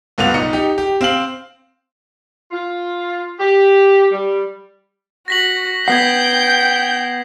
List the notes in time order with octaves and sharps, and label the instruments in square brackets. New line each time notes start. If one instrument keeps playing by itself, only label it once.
[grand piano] C#2 G2 B3 F4 F7
B1 D#4 C#7
D#4 G4
G4
C4 F5 F#7
[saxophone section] F4
G4
G3
[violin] F#4 [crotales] A#6 B6 F#7
[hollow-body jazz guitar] B3 F#5 [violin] G5 G6 [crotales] G#6 B6 C7